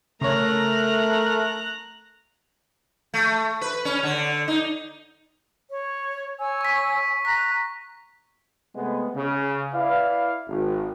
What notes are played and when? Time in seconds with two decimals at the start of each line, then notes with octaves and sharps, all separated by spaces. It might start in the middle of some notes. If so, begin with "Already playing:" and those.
0.21 C#3 A3 A#4 C#5 A#5 F#6
3.14 A3
3.61 B4
3.85 C#4
4.03 D3
4.48 D#4
5.69 C#5
6.38 C#5 G#5 E6
6.61 C#6 B6
7.25 A#5 F#6 B6
8.74 C3 G#3 A3 B3
9.15 C#3
9.73 E4 B4 D5 F5
10.47 G#1